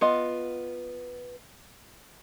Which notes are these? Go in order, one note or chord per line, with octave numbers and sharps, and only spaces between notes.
B3 F4 D#5